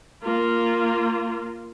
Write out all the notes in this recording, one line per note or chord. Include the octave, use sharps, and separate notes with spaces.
A#3 F4